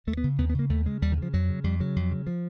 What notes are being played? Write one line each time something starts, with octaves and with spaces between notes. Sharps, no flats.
D#2 A3
B3
C#3
D#2 B3
B3
C#3 A#3
D#2 A3
C#3 G#3
D#2 G3
D#3
C#3 F3
F2 F#3
C#3
F2 G3
C#3 F#3
F2
C#3
F3